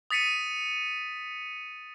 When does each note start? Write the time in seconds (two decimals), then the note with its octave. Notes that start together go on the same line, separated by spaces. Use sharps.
0.10 D#6 A6 B6 C#7 D#7